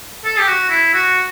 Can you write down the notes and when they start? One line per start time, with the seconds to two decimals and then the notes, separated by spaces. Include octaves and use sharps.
0.24 A4
0.39 G4
0.48 F#4
0.70 E4
0.94 F#4